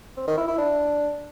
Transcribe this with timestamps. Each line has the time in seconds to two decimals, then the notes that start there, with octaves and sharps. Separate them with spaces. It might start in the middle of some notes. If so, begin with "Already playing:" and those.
0.17 C4
0.27 D#3
0.37 E4
0.48 E4
0.58 D4